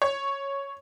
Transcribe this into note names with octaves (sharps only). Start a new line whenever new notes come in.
C#5